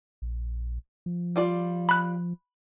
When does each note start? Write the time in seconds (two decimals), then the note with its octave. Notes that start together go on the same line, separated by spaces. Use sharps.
0.22 A#1
1.06 F3
1.36 G3 F4 D5
1.89 B5 F#6